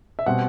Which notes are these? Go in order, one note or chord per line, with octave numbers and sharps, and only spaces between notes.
E5
B2 G3 C4 F#5